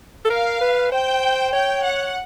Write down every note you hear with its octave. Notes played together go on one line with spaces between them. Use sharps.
A4
A#4 F5
B4
C5 G5
C#5 G5
F#5